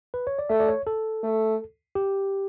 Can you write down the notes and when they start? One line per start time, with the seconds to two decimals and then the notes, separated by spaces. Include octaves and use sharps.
0.14 B4
0.27 C#5
0.39 D5
0.49 A3 E5
0.60 D5
0.68 C#5
0.87 A4
1.23 A3
1.95 G4